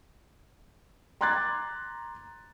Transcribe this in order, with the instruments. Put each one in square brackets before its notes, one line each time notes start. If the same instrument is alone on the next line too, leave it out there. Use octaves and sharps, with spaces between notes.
[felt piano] A#5 C6 D6 F#6 G#6 A6